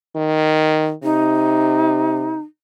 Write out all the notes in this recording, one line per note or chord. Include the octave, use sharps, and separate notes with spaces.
D#3
C3 D#4